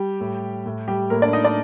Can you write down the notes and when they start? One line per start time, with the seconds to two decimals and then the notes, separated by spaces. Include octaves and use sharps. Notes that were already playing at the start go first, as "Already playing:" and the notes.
Already playing: G3 G4
0.20 A2
0.66 A2
0.88 G3 G4
1.10 A2 A#3 A#4
1.22 D4 D5
1.33 D#4 D#5
1.45 D4 D5